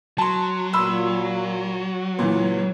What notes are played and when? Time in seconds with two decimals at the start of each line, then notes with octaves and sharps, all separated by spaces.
0.18 F#3 A5 C6
0.73 A#2 B5 C6 E6
2.19 C#2 A#2 E3 B4 C#5